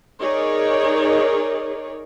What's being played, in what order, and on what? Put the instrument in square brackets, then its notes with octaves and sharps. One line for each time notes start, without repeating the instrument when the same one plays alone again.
[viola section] D#4 G#4 A#4 C#5 D5